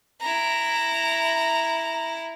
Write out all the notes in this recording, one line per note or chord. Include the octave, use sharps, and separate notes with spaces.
E4 A#5